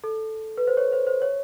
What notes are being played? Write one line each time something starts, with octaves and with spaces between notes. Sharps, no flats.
A4
B4
C5
C#5
C5
C5
C#5